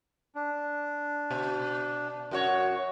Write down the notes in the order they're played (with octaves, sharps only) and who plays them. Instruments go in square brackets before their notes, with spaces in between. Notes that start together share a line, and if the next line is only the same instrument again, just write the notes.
[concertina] D4
[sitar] B2
F#2 F#4 C#5